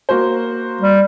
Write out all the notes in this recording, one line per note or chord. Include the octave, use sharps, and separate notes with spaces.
A#3 F#4 C5
G3